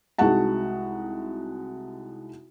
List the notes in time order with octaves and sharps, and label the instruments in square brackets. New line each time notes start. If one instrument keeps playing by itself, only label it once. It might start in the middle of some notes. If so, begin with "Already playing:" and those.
[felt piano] C2 G#3 D#4 F#4 F#5 A5